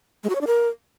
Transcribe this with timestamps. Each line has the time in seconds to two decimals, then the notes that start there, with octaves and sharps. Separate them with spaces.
0.24 G#3
0.29 F#4
0.35 C#5
0.41 D4
0.47 A#4